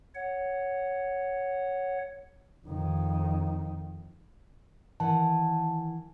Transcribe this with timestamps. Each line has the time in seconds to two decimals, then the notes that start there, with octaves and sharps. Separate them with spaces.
0.15 C#5 F#5
2.67 F2 D#3
5.00 D#3 E3 F#5 A5